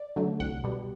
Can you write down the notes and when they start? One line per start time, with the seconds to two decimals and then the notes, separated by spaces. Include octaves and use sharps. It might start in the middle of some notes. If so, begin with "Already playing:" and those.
Already playing: D5
0.16 D3 F#3 A3
0.40 C2 F#5
0.64 B2 G3